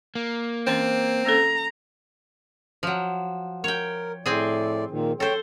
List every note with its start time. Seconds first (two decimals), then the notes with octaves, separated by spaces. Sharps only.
0.15 A#3
0.67 E3 C4 C#4 C5
1.26 A#3 C#4 A4 A#5
2.83 F3 F#3
3.64 A#4 C#5 G5
4.26 A2 C4 G#4 D5
4.90 A#2 D#3
5.20 A4 C5 C#5 G5